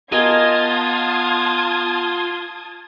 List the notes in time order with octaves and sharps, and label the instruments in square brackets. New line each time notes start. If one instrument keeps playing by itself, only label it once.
[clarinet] B3 [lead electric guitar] F4 [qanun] A#4 D#5 G#5 [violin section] A5 D#6 G#6